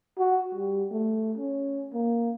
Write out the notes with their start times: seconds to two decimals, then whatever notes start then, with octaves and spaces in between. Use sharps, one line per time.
0.19 F#4
0.55 G3
0.92 A3
1.38 C#4
1.93 A#3